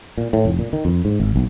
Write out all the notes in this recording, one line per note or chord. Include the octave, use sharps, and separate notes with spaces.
A#2
A2
F1
A#2
D#3
F2
G#2
G#1
B1